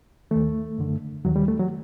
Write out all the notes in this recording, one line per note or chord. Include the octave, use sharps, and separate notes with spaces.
D#2 D#3 A3
F#2 D3
D#2 D#3 F#3
G3
A3
F#3